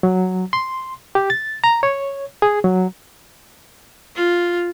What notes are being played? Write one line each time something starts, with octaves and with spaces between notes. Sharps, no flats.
F#3
C6
G4
A6
A#5
C#5
G#4
F#3
F4